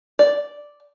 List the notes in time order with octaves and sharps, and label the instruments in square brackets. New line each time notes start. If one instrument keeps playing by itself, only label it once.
[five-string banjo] D5